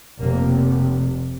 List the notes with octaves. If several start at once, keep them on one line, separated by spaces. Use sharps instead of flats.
F1 F2 C3 A#3